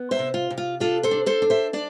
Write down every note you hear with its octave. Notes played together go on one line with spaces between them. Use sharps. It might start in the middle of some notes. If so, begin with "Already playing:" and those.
Already playing: B3
C5 E5
C3
F4
C3
F4
D4 F4 A4
A4 C5
D4
A4 C5
D4
C5 E5
D4 D5